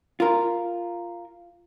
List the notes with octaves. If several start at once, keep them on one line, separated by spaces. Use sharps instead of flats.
F4 A#4